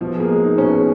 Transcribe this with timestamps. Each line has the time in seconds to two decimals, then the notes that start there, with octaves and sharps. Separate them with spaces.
0.01 B2 F3
0.15 G#4
0.20 A#3
0.29 G#3
0.44 D#4
0.58 B2 C#4
0.73 G#4